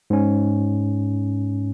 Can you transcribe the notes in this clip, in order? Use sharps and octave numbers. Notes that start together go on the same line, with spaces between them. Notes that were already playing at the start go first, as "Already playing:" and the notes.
G#2 C#4